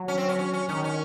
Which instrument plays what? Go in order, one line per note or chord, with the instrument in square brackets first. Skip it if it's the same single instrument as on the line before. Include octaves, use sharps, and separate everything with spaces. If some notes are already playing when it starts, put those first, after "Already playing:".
Already playing: [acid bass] F#3
[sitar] C#4
C4
C#4
C#4
C#4
[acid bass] D#3 [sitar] C#4
[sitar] C#4